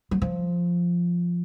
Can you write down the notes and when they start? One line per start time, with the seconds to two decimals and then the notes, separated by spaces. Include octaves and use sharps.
0.11 F#3
0.22 F3